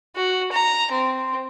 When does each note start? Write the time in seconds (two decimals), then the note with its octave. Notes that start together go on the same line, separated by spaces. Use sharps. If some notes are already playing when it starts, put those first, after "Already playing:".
0.16 F#4
0.52 A#5
0.92 C4